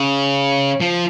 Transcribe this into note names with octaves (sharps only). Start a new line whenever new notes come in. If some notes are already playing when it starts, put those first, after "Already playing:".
Already playing: C#3
F3